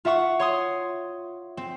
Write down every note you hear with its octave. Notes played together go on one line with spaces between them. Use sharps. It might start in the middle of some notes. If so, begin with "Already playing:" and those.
F4 E5 F#5 C#6
C#5 C6 D#6
C4